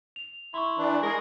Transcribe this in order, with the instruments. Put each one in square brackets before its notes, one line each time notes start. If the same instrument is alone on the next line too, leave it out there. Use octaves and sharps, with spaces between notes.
[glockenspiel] F7
[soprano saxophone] E4 [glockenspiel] C6 C#6
[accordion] E3 D4
[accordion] G#3 G#4 [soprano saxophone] A#4